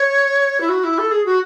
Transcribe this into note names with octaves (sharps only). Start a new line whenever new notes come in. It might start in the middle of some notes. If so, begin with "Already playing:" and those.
Already playing: C#5
E4
F#4
E4
A4
G#4
F#4